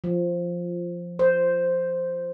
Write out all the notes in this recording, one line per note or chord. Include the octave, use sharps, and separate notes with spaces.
F3
C5